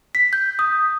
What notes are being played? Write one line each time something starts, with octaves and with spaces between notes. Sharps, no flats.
B6
G6
D#6